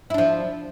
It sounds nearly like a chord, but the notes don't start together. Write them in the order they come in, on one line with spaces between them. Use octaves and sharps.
E4 D4 F3